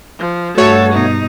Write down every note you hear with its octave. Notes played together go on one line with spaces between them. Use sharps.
F3
G2 A3 F#4 A4 C#5
B2 D#4